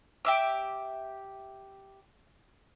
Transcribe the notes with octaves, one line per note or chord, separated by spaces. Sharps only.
G4 E5 D6